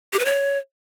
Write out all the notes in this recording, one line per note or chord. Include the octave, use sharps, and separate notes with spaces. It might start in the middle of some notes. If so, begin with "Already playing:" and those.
G4
B4
C#5